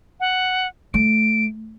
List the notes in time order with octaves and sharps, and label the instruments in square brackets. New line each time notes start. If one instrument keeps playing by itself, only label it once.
[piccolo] F#5
[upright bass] A3 [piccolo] D7